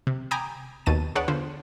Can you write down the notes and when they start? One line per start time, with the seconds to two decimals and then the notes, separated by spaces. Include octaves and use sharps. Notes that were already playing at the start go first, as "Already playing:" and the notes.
0.07 C3
0.31 G5 G#5 A#5 B5 D6 D#6
0.86 D#2 B2 A5 A6 D#7
1.16 D4 G#4 B4 C#5 D5 F#5
1.28 D3 B3 F4 C5